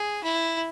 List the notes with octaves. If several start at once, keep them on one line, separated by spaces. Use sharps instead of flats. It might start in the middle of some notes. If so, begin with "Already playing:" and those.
Already playing: G#4
E4